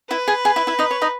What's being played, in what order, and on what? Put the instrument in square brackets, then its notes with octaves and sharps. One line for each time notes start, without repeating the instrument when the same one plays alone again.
[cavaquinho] E4 E5 [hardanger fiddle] B4
[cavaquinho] G#4 G#5
G#4 G#5
E4 E5
E4 E5
D#4 D#5
C#5
D#4 D#5